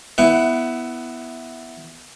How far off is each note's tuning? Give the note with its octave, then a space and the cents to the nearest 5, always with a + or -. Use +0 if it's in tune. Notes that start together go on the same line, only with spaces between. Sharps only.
B3 +0 E4 +0 F#5 +25